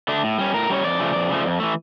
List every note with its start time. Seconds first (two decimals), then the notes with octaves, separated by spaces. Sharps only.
0.08 D3 A3 D4
0.24 A2
0.38 G3 C#4
0.54 A2 A#4
0.70 G3 C#4 C#5
0.84 F2 D5
0.99 C#3 F3 A3
1.15 F2
1.29 C#3 F3 A3
1.45 F2
1.60 E3 A3